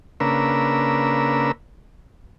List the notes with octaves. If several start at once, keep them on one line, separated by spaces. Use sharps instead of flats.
C#3 A#3 D4 A#4 B4 E6